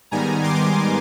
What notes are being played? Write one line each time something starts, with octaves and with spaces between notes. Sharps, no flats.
G#2 D#3 G3 B3 G#5 A#5
C6 D6